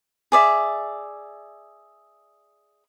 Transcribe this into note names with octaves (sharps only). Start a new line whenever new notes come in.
G#4 D5 E5